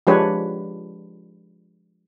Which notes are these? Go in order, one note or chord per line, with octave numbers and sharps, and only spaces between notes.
F3 G#3 D4 G4 B4 C#5